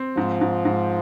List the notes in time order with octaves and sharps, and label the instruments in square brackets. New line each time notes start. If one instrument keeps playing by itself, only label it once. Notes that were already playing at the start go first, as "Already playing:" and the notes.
Already playing: [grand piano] C4
[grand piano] G#2 [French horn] F3
[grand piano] G#2
G#2